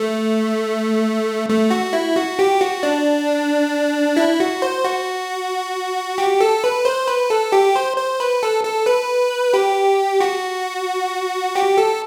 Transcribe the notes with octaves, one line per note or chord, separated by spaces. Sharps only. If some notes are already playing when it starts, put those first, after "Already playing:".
Already playing: A3
A3
F#4
E4
F#4
G4
F#4
D4
E4
F#4
C5
F#4
G4
A4
B4
C5
B4
A4
G4
C5
C5
B4
A4
A4
B4
G4
F#4
G4
A4